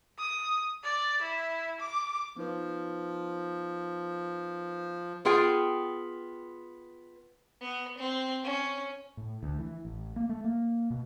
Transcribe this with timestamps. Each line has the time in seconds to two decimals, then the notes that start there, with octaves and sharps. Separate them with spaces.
0.19 D#6
0.83 D5
1.22 E4
1.80 D6
2.36 F3 B3 D#4 B4
5.25 B3 F4 G#4 G5
7.61 B3
7.98 C4
8.44 C#4
9.17 A2
9.43 D2
9.59 E3
9.85 A1
10.16 A#3
10.29 A3
10.44 A#3
10.90 B2